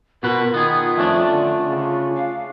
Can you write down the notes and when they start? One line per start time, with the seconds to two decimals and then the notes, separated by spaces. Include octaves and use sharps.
0.23 B2 F4 F#4 A#4 B4
0.54 D#3 B3 G#4
0.98 F2 A3 C#4 D4
1.31 D3
1.69 C#3
2.15 F5